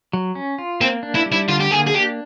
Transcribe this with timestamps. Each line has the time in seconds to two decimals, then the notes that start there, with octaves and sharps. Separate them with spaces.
0.13 F#3
0.35 C#4
0.58 F4
0.81 A#3 C4
1.03 D4
1.15 E4
1.26 G3
1.32 E4
1.49 D3 F4
1.61 G4
1.71 A#3 G#4
1.87 G#4
1.94 D4 G4